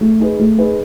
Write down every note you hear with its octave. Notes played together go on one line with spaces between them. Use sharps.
A3
D#4 G#4 B4
A3
D#4 G#4 B4